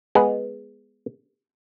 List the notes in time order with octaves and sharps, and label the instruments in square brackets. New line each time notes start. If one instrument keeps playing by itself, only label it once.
[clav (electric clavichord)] G#3 B3 G#4